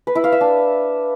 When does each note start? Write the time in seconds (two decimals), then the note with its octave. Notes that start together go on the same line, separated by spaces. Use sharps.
0.07 B4
0.15 E4
0.24 F5
0.32 E5
0.41 D4